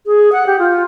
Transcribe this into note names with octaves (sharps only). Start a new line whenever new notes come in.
G#4
F#5
G4
F4